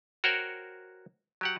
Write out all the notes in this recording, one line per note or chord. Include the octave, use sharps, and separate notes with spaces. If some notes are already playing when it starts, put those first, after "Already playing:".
F#4 A#4 C5 C#5 F#5 G5
F#3 G4 F#5